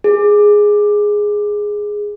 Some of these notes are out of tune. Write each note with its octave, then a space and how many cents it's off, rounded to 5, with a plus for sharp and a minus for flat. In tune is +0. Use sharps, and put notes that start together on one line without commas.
G#4 +0